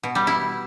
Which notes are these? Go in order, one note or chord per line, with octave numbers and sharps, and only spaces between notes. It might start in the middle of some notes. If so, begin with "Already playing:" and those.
B2
G3
E4